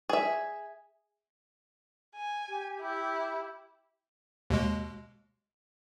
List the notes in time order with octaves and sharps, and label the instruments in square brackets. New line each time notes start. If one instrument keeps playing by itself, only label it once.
[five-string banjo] G#4 E5
[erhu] G#5
[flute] G4
[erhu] E4
[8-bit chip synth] D#2 B2 G#3